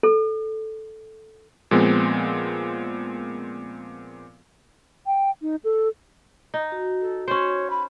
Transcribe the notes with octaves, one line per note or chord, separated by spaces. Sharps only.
A4
A#2 F3 G#3 B3 C4
G5
D#4
A4
D#4
F#4
A4
C#4 C5 C#5
B5